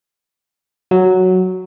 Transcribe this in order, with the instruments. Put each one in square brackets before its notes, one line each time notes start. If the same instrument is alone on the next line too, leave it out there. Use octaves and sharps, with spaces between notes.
[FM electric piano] F#3